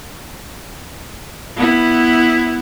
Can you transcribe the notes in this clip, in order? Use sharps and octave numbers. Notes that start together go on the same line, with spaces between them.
B3 E4